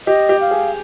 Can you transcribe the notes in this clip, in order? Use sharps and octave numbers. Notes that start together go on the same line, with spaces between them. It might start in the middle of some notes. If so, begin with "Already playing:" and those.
G4 D#5
G4
F5
G#4